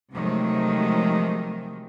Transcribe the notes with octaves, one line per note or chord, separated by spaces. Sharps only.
C3 D#3 F3 F#3 G#3 A3